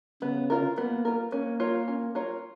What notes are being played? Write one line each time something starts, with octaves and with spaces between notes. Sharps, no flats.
C#3 B3
F4 A#4
A#3 B3
F4 A#4
A#3 C#4
F4 A#4 C#5
C#4
F4 A#4 C#5